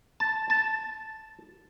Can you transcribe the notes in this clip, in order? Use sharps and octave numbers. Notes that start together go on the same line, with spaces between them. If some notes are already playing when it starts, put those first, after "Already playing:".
A5
A5